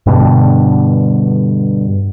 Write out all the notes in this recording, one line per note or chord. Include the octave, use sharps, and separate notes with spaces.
G2 B2 D3